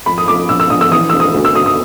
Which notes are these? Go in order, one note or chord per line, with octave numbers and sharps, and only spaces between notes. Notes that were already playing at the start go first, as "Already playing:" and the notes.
F2 B5
D#6
F2 D6
A#1 E6
E6
A#1 D#6
E6
E3 D#6
E1 E6
D#6
D2
E6
D2 D#6
D#6